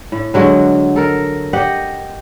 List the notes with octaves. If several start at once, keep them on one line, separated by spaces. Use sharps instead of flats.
A2
D3 F#3 G#3 F#4
A4 A#4
G4 D#5 F#5